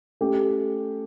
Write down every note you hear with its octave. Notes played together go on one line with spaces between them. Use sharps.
A3 C#4 G4